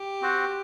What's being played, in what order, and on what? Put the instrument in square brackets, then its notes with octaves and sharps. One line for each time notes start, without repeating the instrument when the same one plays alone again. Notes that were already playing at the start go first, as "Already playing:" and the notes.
Already playing: [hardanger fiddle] G4
[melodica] C4 F#4 C5 F#5